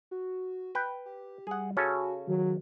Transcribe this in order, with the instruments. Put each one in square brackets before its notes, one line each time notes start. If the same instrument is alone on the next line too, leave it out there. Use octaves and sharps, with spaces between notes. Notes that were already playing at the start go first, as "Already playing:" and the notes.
[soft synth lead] F#4
[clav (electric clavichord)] B4 G5
[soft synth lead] G4
[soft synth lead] G3 [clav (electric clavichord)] G#4 F#5
[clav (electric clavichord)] C#3 C#4 A4 [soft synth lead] F#4
[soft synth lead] D#3 [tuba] F#3